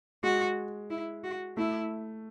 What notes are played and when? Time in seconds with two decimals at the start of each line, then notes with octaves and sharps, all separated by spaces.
0.23 G#3 F#4
0.90 E4
1.24 F#4
1.57 A3 E4